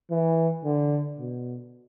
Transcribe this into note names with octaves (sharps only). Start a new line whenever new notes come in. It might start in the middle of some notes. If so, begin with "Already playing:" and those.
E3
D3
B2